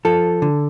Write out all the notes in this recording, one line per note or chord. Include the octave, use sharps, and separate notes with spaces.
F3 A4
D3